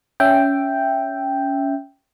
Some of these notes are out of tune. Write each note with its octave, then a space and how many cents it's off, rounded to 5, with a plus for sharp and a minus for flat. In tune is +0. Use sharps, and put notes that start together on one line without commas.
C#4 +15 E5 +5 G5 +0